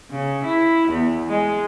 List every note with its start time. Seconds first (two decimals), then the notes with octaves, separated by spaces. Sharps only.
0.11 C#3
0.44 E4
0.89 E2
1.30 G#3